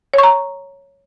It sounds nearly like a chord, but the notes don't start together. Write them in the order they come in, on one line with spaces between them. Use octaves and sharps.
C#5 C#6 A#5